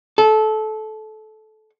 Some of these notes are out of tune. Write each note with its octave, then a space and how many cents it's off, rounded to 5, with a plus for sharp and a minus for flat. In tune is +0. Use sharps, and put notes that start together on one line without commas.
A4 -20